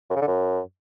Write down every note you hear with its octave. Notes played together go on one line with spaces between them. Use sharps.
F#2
C#3
D3
F#2